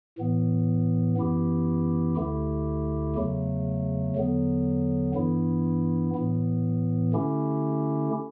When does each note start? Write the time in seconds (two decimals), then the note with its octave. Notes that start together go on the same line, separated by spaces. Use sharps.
0.18 A2 E3 B3
1.17 F#2 E3 B3 E4 G4
2.17 D2 D3 A3 E4 G4
3.16 E2 C#3 F#3 A3
4.16 E2 D3 F#3 B3
5.15 G2 E3 B3 E4
6.14 A2 E3 B3
7.13 D3 A3 C#4 E4 G4